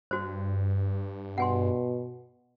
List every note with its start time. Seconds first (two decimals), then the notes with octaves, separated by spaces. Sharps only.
0.11 G2 F#4 C5
1.38 B2 F#5 G#5 C6